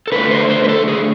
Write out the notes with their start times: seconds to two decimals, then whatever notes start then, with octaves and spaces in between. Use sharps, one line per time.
0.07 A4
0.12 D3 A3 B4
0.31 C5
0.50 C5
0.64 B4
0.69 A4
0.88 G#4